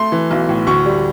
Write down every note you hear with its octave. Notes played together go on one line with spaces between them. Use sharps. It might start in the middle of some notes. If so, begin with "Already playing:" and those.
Already playing: A3 C6
E3
B1
A2
D2 C#6
G3